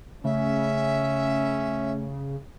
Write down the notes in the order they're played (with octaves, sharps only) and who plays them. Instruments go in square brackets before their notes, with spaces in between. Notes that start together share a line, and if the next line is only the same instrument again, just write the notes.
[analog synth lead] C#3 [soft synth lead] A3 [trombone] C#4 [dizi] E5